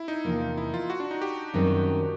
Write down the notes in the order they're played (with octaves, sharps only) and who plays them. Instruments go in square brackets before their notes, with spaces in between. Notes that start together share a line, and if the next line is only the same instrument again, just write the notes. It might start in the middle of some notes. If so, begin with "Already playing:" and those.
Already playing: [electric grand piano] E4
D#4
[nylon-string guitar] E2 C3 F3 A#3
[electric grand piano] E4
F4
F#4
D4
D#4
G4
[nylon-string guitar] F#2 D#3 G3 C4